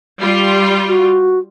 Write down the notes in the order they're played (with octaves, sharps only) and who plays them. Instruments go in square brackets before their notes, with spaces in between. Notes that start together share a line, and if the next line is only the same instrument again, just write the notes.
[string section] G3 F4
[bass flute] F#4